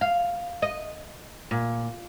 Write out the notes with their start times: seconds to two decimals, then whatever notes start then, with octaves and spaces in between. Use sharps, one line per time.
0.01 F5
0.62 D#5
1.51 A#2